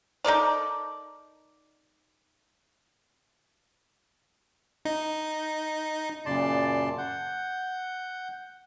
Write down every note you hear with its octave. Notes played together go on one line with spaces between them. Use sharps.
D#4 A4 A#4 D5
D#4
F#2 A#2 C#3 D5 A5 C6
F#5 G6